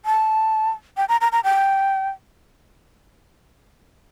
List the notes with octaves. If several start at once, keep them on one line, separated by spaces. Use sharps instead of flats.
A5
G5
A#5
A#5
A#5
G5